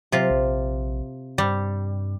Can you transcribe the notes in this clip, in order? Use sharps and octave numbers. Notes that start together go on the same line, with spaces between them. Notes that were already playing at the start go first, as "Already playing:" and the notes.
C3 F#3 F4
A#1
G2 G3